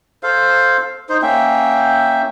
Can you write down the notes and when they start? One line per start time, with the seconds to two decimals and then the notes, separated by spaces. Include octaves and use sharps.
0.23 A4 C5 F5
1.09 D#4 C5
1.22 A#3 C#4 E5 G5